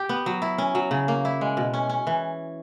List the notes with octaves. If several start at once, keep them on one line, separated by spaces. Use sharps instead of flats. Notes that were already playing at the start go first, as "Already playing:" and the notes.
Already playing: G4
B3
F#3
E4
C#4
F#3
C#3
A#3
E4
G#3
B2
C#4
C#4
E3